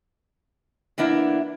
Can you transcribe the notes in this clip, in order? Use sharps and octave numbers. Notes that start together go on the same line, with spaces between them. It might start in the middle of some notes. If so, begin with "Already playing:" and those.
E3 A#3 B3 D4 E4